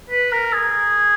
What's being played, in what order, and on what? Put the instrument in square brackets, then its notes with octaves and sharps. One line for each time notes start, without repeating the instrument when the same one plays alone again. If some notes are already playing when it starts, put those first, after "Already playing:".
[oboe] B4
A#4
G#4